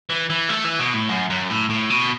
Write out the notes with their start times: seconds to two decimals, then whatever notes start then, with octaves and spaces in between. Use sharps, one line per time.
0.10 E3
0.30 E3
0.49 A3
0.65 E3
0.80 B2
0.95 A2
1.10 F#2
1.30 F#2
1.50 A2
1.70 A2
1.90 B2